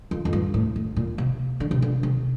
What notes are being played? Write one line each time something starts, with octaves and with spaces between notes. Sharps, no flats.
F2
F2
G2
A2
A2
A#2
C3
D3
C3
D3
C3